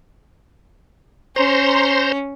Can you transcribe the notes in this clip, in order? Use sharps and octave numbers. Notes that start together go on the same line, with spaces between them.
C#4 C5 A#5 C6